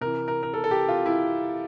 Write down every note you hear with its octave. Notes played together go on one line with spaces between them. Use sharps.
C3 E3 A#4
A#4
A#4
A4
A4
G4
F4
E4